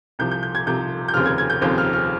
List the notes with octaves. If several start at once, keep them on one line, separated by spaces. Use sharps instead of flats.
C2 C3 F3 G6
G6
G6
G#6
C2 C3 F3 G6
G6
F1 D#2 C#3 F3 C4 F6
G#6
G#6
G6
F1 D#2 C#3 F3 C4 G6
F6
F6